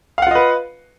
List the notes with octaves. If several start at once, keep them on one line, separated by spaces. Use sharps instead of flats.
F4 B4 D#5 F5 F#5